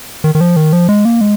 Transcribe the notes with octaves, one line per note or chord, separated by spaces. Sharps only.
D#3
D#3
F3
D#3
F3
G#3
A#3
G#3